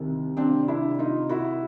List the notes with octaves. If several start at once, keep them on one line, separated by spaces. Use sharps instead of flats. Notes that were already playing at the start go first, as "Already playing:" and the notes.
Already playing: C2 C3 D#3
C4 D4
D4 E4
D#4 F4
E4 F#4